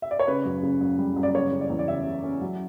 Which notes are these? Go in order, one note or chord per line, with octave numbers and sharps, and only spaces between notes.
E5
D5
C#5
C#3 B4
F#2
C#3
F#2
G3
F#2
D5
C#3 C#5
C#3
D5
E2
D5
C#3 E5
C#3
C#4
F#3